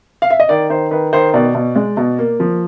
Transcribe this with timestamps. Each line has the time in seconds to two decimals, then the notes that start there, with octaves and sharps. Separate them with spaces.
0.22 F5
0.30 E5
0.40 D#5
0.49 D#3 D5
0.70 D#3 C5
0.91 D#3 B4
1.13 D#3 C5
1.34 B2 D5
1.55 B2
1.76 G#3
1.97 B2
2.19 A#3
2.40 F3